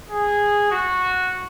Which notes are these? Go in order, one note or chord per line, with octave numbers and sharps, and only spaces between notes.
G#4
F#4